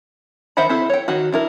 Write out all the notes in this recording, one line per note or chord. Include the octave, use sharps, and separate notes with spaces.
D#3 C5 E5 F#5 B5
C4 E4 A4
C#5 G5
D#3 F#4
D4 E4 A#4